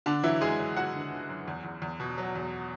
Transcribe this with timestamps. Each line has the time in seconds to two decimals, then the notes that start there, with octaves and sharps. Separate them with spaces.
0.06 D3 D4
0.23 E3 F#3 E4
0.41 F#2 G#3 G#4
0.59 F#3
0.76 F#2 F#4 F#5
0.95 D3
1.11 D3
1.29 F#2
1.48 E2
1.64 E2
1.82 E2
2.00 B2
2.18 F#3
2.35 E2